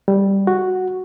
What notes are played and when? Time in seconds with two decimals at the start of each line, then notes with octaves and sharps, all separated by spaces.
0.08 G3
0.47 F#4